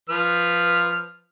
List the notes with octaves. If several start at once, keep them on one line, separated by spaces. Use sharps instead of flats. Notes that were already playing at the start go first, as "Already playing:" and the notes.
F3 B4 F6